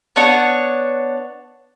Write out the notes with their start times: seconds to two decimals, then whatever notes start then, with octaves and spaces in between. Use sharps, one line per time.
0.16 B3 D4 C#5 F#5